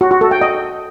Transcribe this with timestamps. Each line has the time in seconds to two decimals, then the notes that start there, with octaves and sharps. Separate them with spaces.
0.01 F#4
0.11 F#4
0.21 A4
0.31 G5
0.41 D#5